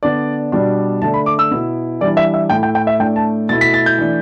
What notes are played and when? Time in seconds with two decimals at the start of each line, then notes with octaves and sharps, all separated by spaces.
0.03 D3 B3 D4 D5
0.52 B2 G3 D4
1.02 D3 A3 D4 A5
1.14 B5
1.26 D6
1.39 E6
1.51 B2 B3 E4
2.01 E3 G3 D4 D5
2.17 E5
2.34 E5
2.50 A2 A3 E4 G5
2.63 G5
2.75 G5
2.87 E5
3.00 A2 A3 D4 G5
3.16 A5
3.49 B2 A3 E4 A6
3.61 B6
3.74 A6
3.86 G6
3.98 E3 A3 D4